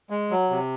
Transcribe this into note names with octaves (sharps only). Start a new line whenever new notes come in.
G#3
F#3
C3